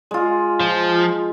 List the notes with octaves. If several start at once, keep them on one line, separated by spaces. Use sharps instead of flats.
G#3 F4
F3